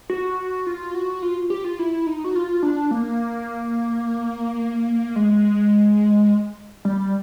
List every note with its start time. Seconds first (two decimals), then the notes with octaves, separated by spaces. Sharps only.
0.10 F#4
0.67 F4
0.94 F#4
1.22 F4
1.50 G4
1.64 F4
1.79 E4
2.07 D#4
2.24 F#4
2.35 F4
2.63 D4
2.91 A#3
5.16 G#3
6.85 G3